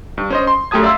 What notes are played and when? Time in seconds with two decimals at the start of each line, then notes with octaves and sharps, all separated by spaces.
0.18 G2
0.30 C#4 C5 D#5
0.47 C6
0.71 F#2 A3 G4 A5 D#6 G#6
0.83 D5 E5 F5 C6 E6